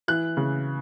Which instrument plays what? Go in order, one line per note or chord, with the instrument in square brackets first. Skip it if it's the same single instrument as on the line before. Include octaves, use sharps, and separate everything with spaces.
[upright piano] E3 F#6
C#3